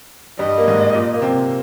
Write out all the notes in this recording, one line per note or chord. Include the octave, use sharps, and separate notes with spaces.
G2 G3 D#5
A#3
G#2 G#3
A#2 A#3
A#3
C3 C4